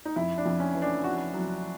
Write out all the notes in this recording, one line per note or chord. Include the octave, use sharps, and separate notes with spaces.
D#4
F2 E4
D4
F2
C#4
E3
D4
F#4
F#3